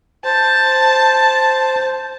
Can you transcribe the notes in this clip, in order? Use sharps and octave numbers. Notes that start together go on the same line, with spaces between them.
C5 A5